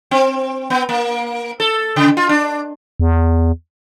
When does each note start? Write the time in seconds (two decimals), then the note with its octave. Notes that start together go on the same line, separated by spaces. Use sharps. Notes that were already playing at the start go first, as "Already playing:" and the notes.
0.11 C4
0.70 B3
0.89 A#3
1.60 A4
1.96 C#3
2.17 F4
2.29 D4
3.00 E2